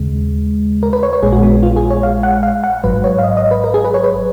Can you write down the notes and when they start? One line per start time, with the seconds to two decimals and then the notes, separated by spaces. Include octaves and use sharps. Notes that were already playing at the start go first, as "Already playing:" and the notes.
Already playing: D#2 C#3 G#3
0.83 A#4
0.93 B4
1.03 C#5
1.13 C#5
1.22 A#1 A#2 G#3 G#4
1.32 F#4
1.43 B3
1.63 F4
1.76 G#4
1.90 C#5
2.03 F5
2.23 F#5
2.43 F5
2.64 F#5
2.84 G#1 G#2 F#3 B4
3.04 C#5
3.18 F5
3.23 D#5
3.37 D#5
3.51 B4
3.64 A#4
3.74 G#4
3.84 B4
3.94 C#5
4.04 B4